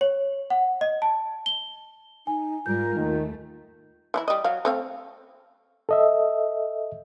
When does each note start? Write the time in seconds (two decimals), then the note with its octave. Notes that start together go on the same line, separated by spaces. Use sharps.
0.01 C#5
0.50 F#5
0.81 D#5
1.02 A5
1.46 G7
2.27 D#4 G#5
2.66 G#2 G3 F4 A#4 G6
2.96 D#2 D#3 A3
4.14 E3 D4 E4
4.28 G3 D#5
4.44 F#3 F5
4.65 A3 C4 F5
5.89 A4 D#5 E5